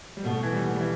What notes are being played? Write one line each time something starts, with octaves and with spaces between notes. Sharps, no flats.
G3
B2 A3
E3
G3
B3
G3
E3